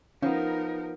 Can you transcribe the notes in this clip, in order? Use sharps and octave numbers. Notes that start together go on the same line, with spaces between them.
F3 B3 C#4 D#4 A#4